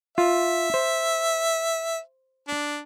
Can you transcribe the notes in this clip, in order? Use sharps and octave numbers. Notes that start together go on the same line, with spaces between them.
F4 E5
C5
D4